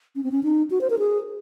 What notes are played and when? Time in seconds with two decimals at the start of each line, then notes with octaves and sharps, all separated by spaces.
0.16 C#4
0.24 C4
0.31 C#4
0.43 D#4
0.71 F#4
0.81 C5
0.90 A#4
0.99 G#4